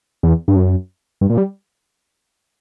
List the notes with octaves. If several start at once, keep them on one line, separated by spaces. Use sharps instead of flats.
E2
G2
F#2
G2
A#2
G3